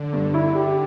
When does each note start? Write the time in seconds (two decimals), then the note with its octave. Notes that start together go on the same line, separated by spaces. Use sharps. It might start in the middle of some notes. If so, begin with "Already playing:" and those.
Already playing: D3
0.13 G2
0.34 E4
0.55 G4